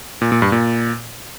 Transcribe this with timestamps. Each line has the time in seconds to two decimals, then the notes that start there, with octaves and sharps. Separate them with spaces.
0.22 A#2
0.32 A#2
0.42 G2
0.52 A#2